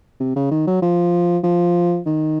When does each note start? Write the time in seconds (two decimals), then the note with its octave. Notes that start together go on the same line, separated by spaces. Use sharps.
0.20 C3
0.36 C#3
0.51 D#3
0.67 F#3
0.82 F3
1.44 F3
2.06 D#3